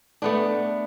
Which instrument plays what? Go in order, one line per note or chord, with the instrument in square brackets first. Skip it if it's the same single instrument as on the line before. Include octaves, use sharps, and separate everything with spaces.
[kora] A3 B3 D4